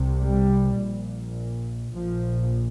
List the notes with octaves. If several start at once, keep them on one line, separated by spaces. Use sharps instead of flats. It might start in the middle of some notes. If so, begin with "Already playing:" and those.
Already playing: C2 C3
G3
A#1 A#2
A#1 A#2 F3